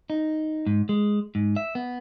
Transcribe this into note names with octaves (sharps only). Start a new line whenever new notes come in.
D#4
G#2
G#3
G#2
E5
B3